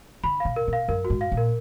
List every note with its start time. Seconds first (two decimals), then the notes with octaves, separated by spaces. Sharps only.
0.24 D3 B5
0.40 B2 F5
0.56 A#4
0.68 B2
0.73 F5
0.88 F#2 A#4
1.05 F#4
1.10 G#2
1.21 F5
1.32 A#2
1.37 A#4